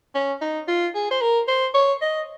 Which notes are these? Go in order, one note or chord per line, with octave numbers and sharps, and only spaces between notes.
C#4
D#4
F4
G#4
C5
A#4
C5
C#5
D#5